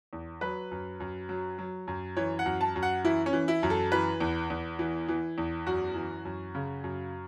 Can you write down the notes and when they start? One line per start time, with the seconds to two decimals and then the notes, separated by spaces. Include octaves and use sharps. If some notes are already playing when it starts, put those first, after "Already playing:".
0.13 E2
0.41 F#3 B4
0.71 F#2
1.00 F#2
1.29 F#3
1.58 F#3
1.88 F#2
2.17 E3 C#5
2.39 F#5
2.46 F#2
2.61 A5
2.76 F#2
2.83 F#5
3.04 E3 E4
3.26 C#4
3.33 E3
3.48 E4
3.63 F#2
3.70 A4
3.92 E3 B4
4.20 E2
4.50 E2
4.79 E3
5.08 E3
5.38 E2
5.67 F#2 F#4
5.96 E3
6.25 F#2
6.55 C#3
6.84 F#2